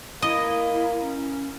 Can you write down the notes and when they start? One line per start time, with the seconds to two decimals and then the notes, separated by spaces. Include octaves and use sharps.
0.22 A#3 E4 D#5
1.01 C#4